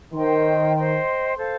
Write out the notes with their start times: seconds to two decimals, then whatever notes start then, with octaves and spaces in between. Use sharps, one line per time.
0.14 D#3 C5 D#5 G5 C6
0.75 C5 D#5 G5 C6
1.37 A4 C5 F5